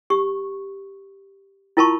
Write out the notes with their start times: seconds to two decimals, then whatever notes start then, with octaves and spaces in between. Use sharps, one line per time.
0.10 G4 C#6
1.77 E4 F4 A#4 A5 B5 C#6